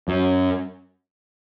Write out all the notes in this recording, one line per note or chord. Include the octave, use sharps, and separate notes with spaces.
F#2